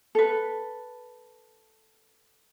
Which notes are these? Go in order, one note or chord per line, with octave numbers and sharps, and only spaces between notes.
A4 B4